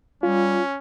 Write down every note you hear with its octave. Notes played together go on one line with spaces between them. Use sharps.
G3 C#4 F4